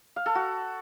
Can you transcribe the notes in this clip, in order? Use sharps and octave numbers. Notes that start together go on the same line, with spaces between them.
F5
A4
F#4